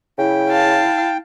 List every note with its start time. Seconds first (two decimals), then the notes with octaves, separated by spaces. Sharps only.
0.19 C#3 E4 G5
0.49 F5 A5